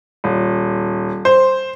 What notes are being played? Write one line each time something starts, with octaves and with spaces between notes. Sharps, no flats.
D#1
C5